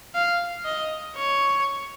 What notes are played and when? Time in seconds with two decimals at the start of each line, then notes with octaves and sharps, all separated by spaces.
0.15 F5
0.65 D#5
1.16 C#5